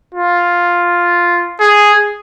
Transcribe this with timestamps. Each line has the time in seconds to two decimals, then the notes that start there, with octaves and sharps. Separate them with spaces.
0.14 F4
1.60 G#4